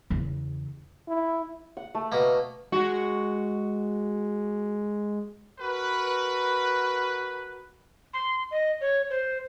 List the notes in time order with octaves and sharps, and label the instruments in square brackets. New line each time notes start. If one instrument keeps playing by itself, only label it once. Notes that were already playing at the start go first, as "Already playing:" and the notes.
[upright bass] E2 C#3
[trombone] E4
[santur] F#5
A3
[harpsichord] B2 A#3
[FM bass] G#3 [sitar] F#4
[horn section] F#4 A#4 B4
[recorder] C6
D#5
C#5
C5